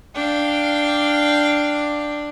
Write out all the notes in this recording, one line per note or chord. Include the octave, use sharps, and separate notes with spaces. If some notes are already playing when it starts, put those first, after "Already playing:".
D4 F5 G5